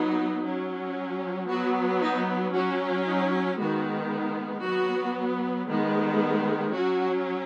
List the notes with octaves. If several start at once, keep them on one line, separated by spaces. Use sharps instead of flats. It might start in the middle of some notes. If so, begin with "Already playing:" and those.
Already playing: F#3 B3 D#4
F#3 C#4
F#3 B3 F#4
D#4
F#3 C#4 F#4
D#4
D#3 G#3 B3 F#4
F#3 B3 F#4
D#3 G#3 B3
F#3 C#4 F#4